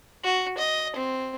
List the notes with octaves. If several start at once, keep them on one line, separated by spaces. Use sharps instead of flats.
F#4
D#5
C4